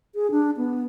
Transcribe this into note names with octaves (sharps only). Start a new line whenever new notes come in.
G#4
D4
B3